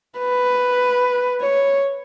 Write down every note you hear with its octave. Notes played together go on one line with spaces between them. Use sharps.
B4
C#5